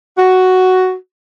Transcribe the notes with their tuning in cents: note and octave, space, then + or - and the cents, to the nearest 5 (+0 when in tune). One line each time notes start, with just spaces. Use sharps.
F#4 +5